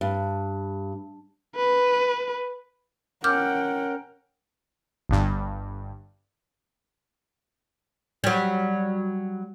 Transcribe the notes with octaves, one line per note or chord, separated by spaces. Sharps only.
G2
B4
C#4 A#4 F#5 G5 D6 F6 G6
G1 G2
F#3 G3